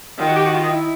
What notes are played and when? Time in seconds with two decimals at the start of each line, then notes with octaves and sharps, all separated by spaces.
0.18 D#3 F4
0.28 F#4
0.36 G4
0.45 F#4
0.54 F4
0.63 D#4
0.71 E4